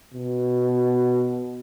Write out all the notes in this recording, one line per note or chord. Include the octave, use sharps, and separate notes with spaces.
B2